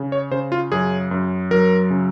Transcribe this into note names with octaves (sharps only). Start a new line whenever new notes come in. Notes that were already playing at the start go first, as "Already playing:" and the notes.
Already playing: C#3
C#5
C#3 C5
F4
F#2 G#4
F#2
F#3 A#4
C#3